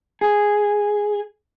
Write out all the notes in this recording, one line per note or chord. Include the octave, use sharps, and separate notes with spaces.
G#4